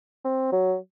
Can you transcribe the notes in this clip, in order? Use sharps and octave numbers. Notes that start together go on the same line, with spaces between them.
C4
F#3